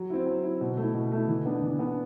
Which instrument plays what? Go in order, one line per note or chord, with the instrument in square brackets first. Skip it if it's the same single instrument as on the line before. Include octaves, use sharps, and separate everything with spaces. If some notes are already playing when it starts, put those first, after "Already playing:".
Already playing: [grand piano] F#3
C4 E4
F#3
C4 E4
B2
A3 E4
B2
A3 E4
E3
B3 D4
E3
B3 D4